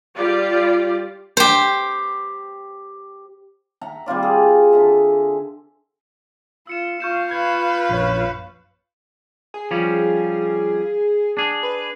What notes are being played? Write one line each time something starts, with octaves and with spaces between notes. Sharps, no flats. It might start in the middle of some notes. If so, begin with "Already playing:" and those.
G3 F4 G4 D5
G4 C5
E5 F#5 A#5
G3 C4 F4 D5
G#4
D3 E5
F4 E6 C#7 E7
F4 F5 C#6 G6 E7
B4 G#6
A#1 F#2 C#5
G#4
F3 G3 C#4
D4 G#4
B4